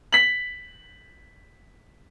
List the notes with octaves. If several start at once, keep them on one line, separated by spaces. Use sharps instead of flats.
B6 F#7